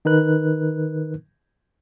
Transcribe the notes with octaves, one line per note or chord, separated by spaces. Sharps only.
D#3 D#4 A#4 B4 F#6